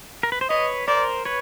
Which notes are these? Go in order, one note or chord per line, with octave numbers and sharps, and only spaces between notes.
A#4
B4
C5
B4 C#5 D#5
A#4 C5 D5
B4 C#5